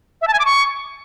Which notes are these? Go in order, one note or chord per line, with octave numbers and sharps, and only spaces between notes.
E5
A5
G#5
D6
C#6